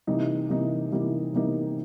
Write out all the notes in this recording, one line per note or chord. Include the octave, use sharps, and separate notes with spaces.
C3 E3 G3 A#3 D#4
C3 E3 G3 A#3 D#4
C3 E3 G3 A#3 D#4
C3 E3 G3 A#3 D#4